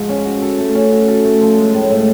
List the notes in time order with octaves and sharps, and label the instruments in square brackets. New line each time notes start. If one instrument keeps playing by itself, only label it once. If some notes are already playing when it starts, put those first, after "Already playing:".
Already playing: [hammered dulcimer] G#2 F3 G#3
C#4
F#4
A4
A3
C#4
F#4
A4
A3
F3
G#3
A2
A2